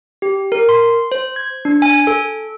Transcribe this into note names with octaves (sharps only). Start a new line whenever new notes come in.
G4
A#4
C6
C5
G#6
D4
G#5
A4